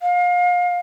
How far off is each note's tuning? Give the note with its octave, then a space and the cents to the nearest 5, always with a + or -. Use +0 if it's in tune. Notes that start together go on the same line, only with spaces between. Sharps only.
F5 +30